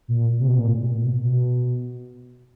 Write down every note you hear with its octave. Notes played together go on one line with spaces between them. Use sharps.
A#2
C3
B2
A#2
A2
A#2
B2
B2